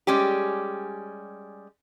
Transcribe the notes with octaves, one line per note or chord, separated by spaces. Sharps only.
G3 G#3 C#4 G4